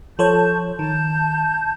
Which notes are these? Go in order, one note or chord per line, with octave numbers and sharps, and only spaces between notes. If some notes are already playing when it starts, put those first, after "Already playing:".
F3 A4 C#5 A5 G6
D#3 A5 G6